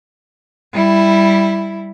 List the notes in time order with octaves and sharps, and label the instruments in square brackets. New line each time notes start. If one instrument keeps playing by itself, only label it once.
[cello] G3 E4